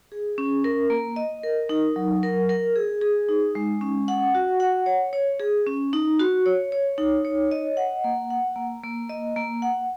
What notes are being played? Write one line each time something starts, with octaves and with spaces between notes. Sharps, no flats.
G#4
C#4
A#4
A#3
D#5
A#4
D#4
F#3
A#4
A#4
G#4
G#4
D#4
G#3
C#4
F#5
F#4
F#5
C#5
C#5
G#4
C#4
D#4
F#4
C#5
C#5
D#4
C#5
D#5
F#5
A#3
F#5
A#3
A#3
D#5
A#3
F#5